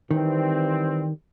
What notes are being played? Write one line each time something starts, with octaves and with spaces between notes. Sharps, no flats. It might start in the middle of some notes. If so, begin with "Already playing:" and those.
D#3 E3 G3 C4